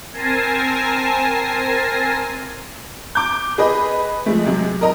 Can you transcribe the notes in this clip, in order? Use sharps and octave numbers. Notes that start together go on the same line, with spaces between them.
C4 A#4 G#5 A5 A#6 C7
D6 G6
G#4 B4 D#5
F3 G#3 A3
C3 F#3 G#3
A#4 D#5 A#5